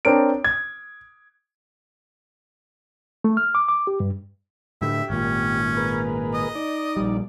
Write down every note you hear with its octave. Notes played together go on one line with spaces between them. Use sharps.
C4 D4 A#4 C#5 D7
G#6
A3
F6
D6
D6
G4
G2
A2 D3 A3 G4 E5
G#1 A#2 C#4
G#4 A#4 B4
D#5
D#4 D5
A#1 G3